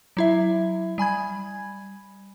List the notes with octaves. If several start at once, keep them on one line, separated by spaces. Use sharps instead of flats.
F#3 E4 E5
G3 G#5 B5 G#6